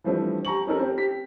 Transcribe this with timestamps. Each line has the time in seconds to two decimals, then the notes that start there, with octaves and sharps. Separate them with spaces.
0.04 E3 F3 G3 A3 C4 D4
0.45 G4 A#5 C#6 F#7
0.67 C4 C#4 D#4 G4 A4 A#4
0.80 C4 G4
0.97 G4 B6